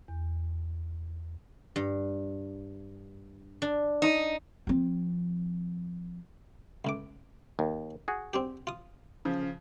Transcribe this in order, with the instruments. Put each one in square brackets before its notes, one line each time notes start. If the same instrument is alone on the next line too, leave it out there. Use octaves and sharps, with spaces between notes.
[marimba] E2
[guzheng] G2
D4
[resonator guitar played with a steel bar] D#4
[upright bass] F3 C4
[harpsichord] C#2 A2 D6
[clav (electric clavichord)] D#2
F#4 G#4
[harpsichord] C4 D4 G4
F4 D#6
[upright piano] C#3 F3